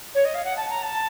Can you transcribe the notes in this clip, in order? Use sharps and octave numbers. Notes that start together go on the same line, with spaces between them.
C#5
D#5
F5
F#5
A5
A#5
A5